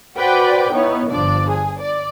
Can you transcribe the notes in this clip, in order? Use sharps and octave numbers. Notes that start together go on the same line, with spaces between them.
F#4 B4 C5 D5 F#5 G5
B3 D#4 E4 C#5
G1 F3 D4 D5
G#4
D5